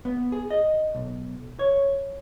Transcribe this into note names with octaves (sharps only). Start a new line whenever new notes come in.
B3
G#4
D#5
B1
C#5